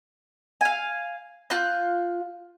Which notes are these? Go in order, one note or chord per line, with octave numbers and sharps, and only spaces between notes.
F5 G#5
F4 F#6 G6